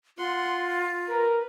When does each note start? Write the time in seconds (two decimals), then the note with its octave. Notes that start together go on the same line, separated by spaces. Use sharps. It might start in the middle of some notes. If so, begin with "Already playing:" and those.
0.18 F4 F#5 C6
1.08 A#4 B4